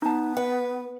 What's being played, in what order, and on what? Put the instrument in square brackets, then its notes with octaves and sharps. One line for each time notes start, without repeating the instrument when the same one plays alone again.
[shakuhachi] B3 [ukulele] D#4 A5
[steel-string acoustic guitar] B4 [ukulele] F#5